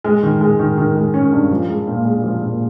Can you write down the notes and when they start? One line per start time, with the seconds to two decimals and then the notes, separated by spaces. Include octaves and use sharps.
0.04 G#3
0.23 D#3
0.41 G#3
0.59 D#3
0.77 D#3
0.96 G#3
1.14 C#4
1.32 G2
1.50 F3
1.69 G#3
1.87 A#2
2.05 G#3
2.23 F3
2.42 A#2